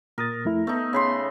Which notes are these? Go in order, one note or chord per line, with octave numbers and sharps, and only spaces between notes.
A#2 A#4 D#6 A6
F2 A3 E4
A3 B3 D#4
C#3 B5 C6